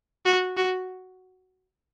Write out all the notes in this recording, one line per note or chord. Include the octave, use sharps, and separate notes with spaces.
F#4
F#4